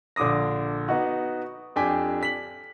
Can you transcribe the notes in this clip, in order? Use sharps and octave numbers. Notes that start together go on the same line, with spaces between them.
A#1 D3 D6 D#6 A#6
B3 D#4 F#4
F2 D4 G4 G5 G#5 B6
B6 F#7